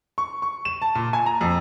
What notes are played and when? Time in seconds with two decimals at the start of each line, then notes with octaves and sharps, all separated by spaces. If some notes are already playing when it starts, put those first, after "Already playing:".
0.18 C#6
0.42 C#6
0.65 E7
0.82 A5
0.95 A#2
1.13 G#5
1.26 A#5
1.41 F2